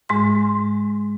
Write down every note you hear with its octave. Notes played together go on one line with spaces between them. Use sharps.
G#2 G#3 C6